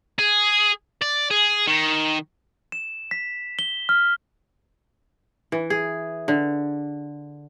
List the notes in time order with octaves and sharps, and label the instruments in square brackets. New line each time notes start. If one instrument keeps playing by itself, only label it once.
[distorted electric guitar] G#4
D5
G#4
D#3
[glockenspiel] E7
B6
G7
F6
[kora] E3
G#4
D3